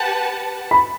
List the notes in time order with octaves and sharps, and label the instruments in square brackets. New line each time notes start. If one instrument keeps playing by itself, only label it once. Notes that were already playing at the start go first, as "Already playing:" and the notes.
Already playing: [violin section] G4 B4 F#5 A5
[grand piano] B5